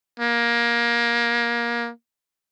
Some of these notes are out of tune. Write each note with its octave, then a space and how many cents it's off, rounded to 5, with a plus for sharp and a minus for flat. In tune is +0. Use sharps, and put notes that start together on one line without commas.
A#3 +20